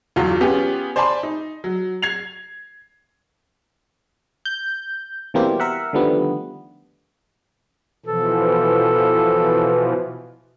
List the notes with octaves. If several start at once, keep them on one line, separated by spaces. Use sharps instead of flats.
G1 E2 F#3 F4
B3 C#4 F4 G4 G#4
C5 D5 G#5 A5 B5 C6
D#4
F#3
G#6 C7 F7
G6
B2 E3 G3 A#3 C4 G4
A#4 E5 F#5
D3 D#3 F3 G3 A3 B3
B2 E3 F3 A4